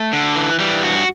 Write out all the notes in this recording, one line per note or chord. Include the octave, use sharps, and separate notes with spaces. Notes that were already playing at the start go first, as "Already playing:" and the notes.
Already playing: A3
D3
E3
E3 G3
G2 F#4